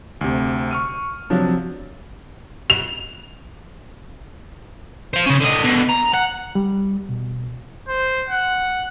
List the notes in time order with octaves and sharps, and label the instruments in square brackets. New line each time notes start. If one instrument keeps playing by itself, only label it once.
[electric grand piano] D2 C3
C#6 F6 D#7
[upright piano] C3 F3 F#3 [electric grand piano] D4
[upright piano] F7
[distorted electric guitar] C5 F5
C#3 C#4
D3 D#5
B2 D3
A#5
F#5
[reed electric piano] G3
B2
[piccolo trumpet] C5
F#5